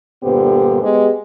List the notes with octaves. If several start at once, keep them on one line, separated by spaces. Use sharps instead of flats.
G2 A#2 D3 B3 G4 C5
G#3 B3 G4 G#4